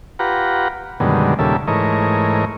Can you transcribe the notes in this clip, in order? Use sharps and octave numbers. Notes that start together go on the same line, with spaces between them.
F4 G4 B4 F#5 A#5
F#2 B2 D3 D#3 G3 G#3
D#2 A#2 C#3 G3 A4 E5
G#2 E3 A3 A#4 C#5 D#5